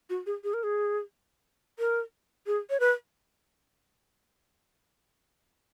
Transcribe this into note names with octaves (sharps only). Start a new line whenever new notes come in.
F#4
G#4
G#4
A#4
G#4
A#4
G#4
C#5
B4